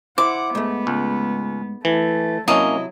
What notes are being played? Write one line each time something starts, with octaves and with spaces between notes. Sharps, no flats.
E4 C5 F#5 D6
G#2 A3 B3
C#2
E3 A3
C3 F#3 A#3 C#4 E4 D#5 A5